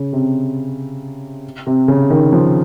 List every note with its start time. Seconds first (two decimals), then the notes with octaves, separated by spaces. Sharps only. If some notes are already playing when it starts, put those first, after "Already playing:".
Already playing: C#3
0.13 C3
1.67 C3
1.88 C#3
2.10 D#3
2.33 F3